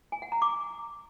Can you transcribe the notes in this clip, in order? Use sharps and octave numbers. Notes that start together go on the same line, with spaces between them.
G#5
F#5
A#5
D6